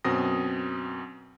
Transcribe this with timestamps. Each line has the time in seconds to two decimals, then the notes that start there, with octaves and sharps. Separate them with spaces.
0.04 F#2 B2 C4 D#6 A#6